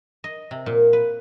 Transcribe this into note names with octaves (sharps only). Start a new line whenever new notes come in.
D#5
C3
A#2
B4